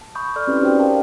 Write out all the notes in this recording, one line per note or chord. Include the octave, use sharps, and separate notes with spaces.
A5
B5 C#6 D#6 G6
A4 D5 C6 F6
C4 C#4 E4 G4 B4
D#4 F#4 C5 D5 G5
G4 A#4 F5 G5 A5